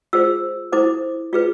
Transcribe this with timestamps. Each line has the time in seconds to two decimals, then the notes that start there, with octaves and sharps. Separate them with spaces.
0.13 F4 G#4 C5 E6
0.72 E4 A4 C5 D6
1.33 F4 G#4 B4